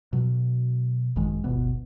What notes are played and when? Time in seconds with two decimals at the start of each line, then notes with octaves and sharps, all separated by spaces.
0.13 B2 F#3
1.16 G#1 F#2 D#3 G#3
1.44 D1 G1 B2 B3